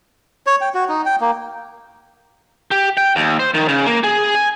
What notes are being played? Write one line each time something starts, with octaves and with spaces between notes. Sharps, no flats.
C#5
G5
F#4
D#4
G5
A#3
G4
G5
D#2
C5
D#3
C#3
A#3
G#4
G#5